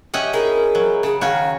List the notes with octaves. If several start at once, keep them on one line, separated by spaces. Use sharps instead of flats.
C#4 G4 D#5 E5 F#5
D#4 E4 G#4 A#4
F#3
C#3 G#4
D#3 C#4 F#4 F5